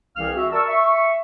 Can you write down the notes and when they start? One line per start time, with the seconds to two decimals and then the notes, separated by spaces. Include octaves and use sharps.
0.17 C2 E3 C4 G#4 F5 F6
0.36 F#4 E5
0.51 A#4 D5 A5 C#6 E6
0.68 E5 C#6